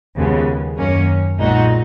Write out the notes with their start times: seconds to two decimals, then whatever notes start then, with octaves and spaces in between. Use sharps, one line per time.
0.15 D#2 C#3 F3 G#3 B3
0.76 F#2 D#3 A#3 C#4
1.37 B1 A#2 G#3 D#4 F#4